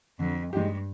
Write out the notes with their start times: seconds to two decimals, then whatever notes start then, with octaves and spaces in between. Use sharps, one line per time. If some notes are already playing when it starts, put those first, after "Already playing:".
0.19 F2 D3
0.53 G2 G#3 D#4 G4